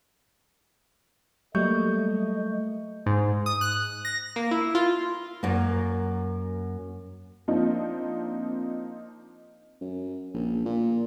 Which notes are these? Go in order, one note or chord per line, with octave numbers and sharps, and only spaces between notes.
F#3 G3 A3 A#3 A4 D#5 C#6 G6
G#2
D#6
F#6
A#6
A#3
E4
F4
F#2 A#3
F3 A#3 C4 D4 D#4
F#2
A#1
A#2